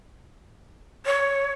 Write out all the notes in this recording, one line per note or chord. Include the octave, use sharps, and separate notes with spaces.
C#5